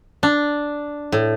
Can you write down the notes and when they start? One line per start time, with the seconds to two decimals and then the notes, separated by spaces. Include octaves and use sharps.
0.23 D4
1.12 A2